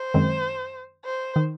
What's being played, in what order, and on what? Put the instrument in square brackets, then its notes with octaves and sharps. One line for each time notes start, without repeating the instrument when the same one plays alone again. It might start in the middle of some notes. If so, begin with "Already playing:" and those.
Already playing: [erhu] C5
[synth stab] F#2 D#3 G#3 C4
[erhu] C5
[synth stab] D#3